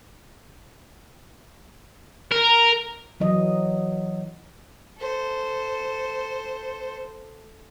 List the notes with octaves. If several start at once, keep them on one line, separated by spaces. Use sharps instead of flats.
A#4
E3 F#3 D#5
A4 C5